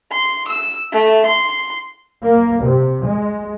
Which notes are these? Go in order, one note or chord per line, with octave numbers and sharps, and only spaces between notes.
C6
E6
A3
C6
A#3
C3
G#3